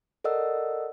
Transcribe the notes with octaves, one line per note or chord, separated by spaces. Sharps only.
A4 A#4 D5 D#5 F#5 E6